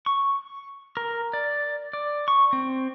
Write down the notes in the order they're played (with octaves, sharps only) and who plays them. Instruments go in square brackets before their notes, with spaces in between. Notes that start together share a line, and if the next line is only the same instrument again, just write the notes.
[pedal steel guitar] C#6
A#4
D5
D5
C#6
C4